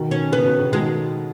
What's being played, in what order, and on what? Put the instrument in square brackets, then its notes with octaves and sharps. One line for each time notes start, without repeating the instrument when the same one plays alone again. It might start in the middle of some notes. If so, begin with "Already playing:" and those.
Already playing: [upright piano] B2 D#3
[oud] C#4
[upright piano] C#3 [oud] B3
[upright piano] B2
C#3
[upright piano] B2 D#3 [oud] G#3